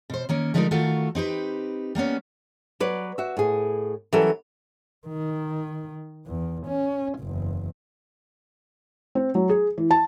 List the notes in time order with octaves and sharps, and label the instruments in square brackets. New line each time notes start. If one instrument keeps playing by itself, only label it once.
[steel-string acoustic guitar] B2 C5
D#3 A#3 C#4
D3 F3 G#3 A3 D#4 A#4
D#3 A3 F4 F#4 A4 A#4
C4 D#4 G4 B4
G3 A#3 B3 C#4
[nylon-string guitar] F#3 B4 D5
F#4 E5
A2 G#4
E3 F#3 G3 C#4 A4 A#4
[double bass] D#3
E2
C#4
F#1 E2
[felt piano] C4
F#3
G#4
E3
A5